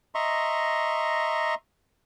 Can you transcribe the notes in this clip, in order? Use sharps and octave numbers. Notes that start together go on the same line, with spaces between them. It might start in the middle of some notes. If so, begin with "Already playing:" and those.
D#5 E5 A#5 C6 C#6